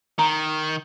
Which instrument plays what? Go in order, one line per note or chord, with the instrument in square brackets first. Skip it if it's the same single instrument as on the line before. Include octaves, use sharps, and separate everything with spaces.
[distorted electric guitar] D#3 [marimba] A#5